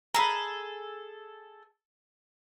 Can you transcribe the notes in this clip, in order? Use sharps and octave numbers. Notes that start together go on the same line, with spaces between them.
G#4 A4 A#5 B5